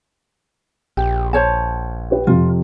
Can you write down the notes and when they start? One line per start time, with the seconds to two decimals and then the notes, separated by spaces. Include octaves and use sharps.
0.97 A#1 G4
1.33 C5 C#5 A5
2.11 G4 B4
2.27 F2 C3 F4